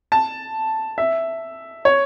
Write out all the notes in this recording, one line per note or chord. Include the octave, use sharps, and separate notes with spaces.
A5
E5
C#5